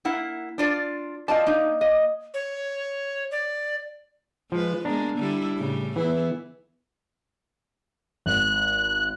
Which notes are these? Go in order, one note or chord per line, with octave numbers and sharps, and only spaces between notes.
A#3 E4 F#5
D4 F4 D5
C4 F4 D5 D#5 F5 A5
A#3 D#4
A#3 D#5
C#5
D5
F3 G#3 B4
G#3 A#3 B3 D4 A#5
D3 G3 E4
A2 C#3 G3
E3 B3 E4 G#4
G#1 F#6